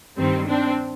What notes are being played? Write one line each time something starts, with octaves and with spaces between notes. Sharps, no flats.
G2 D#3 G3 C4
C4 D4